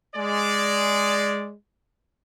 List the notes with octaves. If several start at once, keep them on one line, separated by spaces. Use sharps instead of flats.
G#3 D5